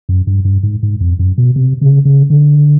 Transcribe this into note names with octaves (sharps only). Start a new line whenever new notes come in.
F#2
G2
G2
G#2
G#2
F2
F#2
B2
C3
C#3
C#3
D3